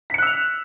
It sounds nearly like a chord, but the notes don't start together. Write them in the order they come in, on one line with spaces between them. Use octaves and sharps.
B6 C#7 F#6 E6 F7